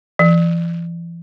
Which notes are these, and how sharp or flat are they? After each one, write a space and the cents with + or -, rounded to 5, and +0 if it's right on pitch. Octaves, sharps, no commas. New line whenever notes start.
E3 +40